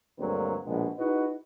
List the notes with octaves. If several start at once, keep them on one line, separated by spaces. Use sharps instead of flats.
D2 G2 F#3 G#3 A#3 C4
A#1 B2 G#3
D#4 E4 F#4 G#4 B4 D#5